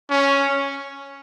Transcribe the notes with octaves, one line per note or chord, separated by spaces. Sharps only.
C#4